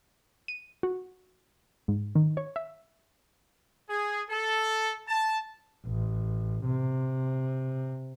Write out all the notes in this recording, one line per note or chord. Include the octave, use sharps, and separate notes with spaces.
D#7
F#4
G#2
D#3
C#5
E5
G#4
A4
A5
A1
C3